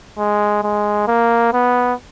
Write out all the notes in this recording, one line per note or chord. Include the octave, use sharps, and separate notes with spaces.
G#3
G#3
A#3
B3